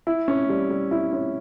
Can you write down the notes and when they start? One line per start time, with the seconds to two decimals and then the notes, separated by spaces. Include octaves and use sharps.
0.07 E4
0.28 C#4
0.49 G3
0.70 G3
0.91 E4
1.13 C#4